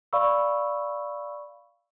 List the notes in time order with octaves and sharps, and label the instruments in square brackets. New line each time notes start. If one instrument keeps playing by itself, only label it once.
[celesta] D5 F5 B5 C#6 E6